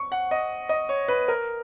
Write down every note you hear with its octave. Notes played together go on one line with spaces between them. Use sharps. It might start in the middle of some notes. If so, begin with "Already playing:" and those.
Already playing: C#6
F#5
D#5
D#5
C#5
B4
A#4